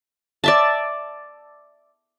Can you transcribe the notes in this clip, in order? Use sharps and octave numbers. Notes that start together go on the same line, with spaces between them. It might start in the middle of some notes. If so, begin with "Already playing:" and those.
D5 E5 A5